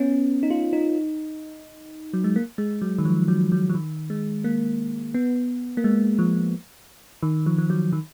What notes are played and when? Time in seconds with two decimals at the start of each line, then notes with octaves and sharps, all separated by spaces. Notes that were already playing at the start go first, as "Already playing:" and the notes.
Already playing: B3 C#4
0.43 D#4
0.50 F4
0.73 D#4
2.13 F#3
2.24 G#3
2.36 A#3
2.58 G#3
2.82 F#3
2.98 D#3
3.05 F3
3.28 F#3
3.52 F#3
3.69 F3
3.75 D#3
4.10 G#3
4.44 A#3
5.14 B3
5.77 A#3
5.84 G#3
6.19 F3
7.23 D#3
7.46 F3
7.58 F3
7.70 F#3
7.93 D#3